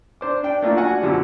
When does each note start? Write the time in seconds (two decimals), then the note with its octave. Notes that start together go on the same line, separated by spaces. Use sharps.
0.21 D4 C5 D6
0.43 D4 G5
0.62 A3 A#3 D4 F4
0.77 D4 F#4 F#5 G#5
1.01 F#2 B2 D3 F3 G3